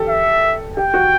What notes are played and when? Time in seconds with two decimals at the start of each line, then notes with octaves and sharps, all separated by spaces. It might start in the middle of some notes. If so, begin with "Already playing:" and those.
Already playing: G4 A4
0.09 E5
0.77 G4 G5
0.94 F#4